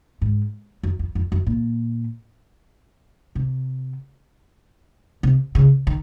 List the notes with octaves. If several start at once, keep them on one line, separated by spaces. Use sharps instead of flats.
G#2
F#2
F2
F2
F#2
A#2
C3
C3
C#3
D#3